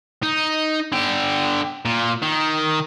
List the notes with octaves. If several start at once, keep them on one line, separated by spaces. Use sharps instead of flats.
D#4
D3 G4
A#2
D#3